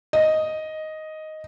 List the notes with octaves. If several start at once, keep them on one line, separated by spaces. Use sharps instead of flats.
D#5